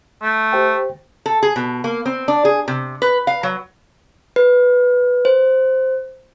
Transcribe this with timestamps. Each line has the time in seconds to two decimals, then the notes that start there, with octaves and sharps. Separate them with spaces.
0.22 A3
0.53 G4 C5 G5
1.26 A4
1.43 G#4
1.56 B2
1.84 A#3
2.06 C4
2.28 D4
2.45 G#4
2.68 C3
3.02 B4
3.27 F5
3.43 F#3
4.36 B4
5.25 C5